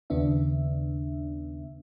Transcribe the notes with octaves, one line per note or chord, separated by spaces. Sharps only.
D#2 C#3 B3 D4 E5